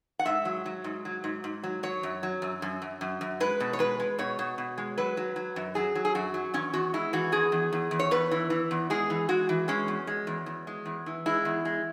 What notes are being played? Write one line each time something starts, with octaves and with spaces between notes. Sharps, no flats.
F#5
G#2 E5
F#3
F#3
G#2
F#3
G#2
G#2
F#3
F#3 C#5
F#2
F#3
F#2
F#2
F#2
F#2
F#2
G#3 B4
B2
C#5
G#3 B4
G#3
B2 C#5
B2
B2
G#3
F#3 B4
F#3
F#3
F#2
F#3 G#4
F#3
G#4
F#2 F#4
F#3
E2 C#4
E2 F#4
G#3 E4
E3 F#4
E2 G#4
E2
E2
E2
C#5
E2 B4
E3
E3
E2
G#3 G#4
E3
G#3 F#4
E3
G#3 C#4
E2
G#3
E2
E2
G#3
E2
E3
G#3 E4
E2
G#3